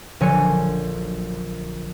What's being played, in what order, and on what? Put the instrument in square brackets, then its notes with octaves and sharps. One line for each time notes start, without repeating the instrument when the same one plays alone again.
[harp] A#1 D3 F#3 C#5 G#5 C#7